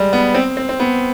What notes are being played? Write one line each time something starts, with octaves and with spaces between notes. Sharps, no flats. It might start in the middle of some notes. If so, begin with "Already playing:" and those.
Already playing: G3 G#3
B3
C4
C4
C4
B3